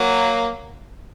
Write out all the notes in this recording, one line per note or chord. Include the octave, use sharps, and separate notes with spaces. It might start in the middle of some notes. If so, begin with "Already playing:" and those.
Already playing: F#3 A#3